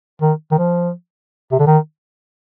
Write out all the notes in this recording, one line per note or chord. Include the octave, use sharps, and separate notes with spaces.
D#3
D#3
F3
C3
D3
D#3